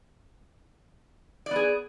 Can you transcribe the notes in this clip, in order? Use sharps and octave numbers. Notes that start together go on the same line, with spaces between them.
B3 G#4 D5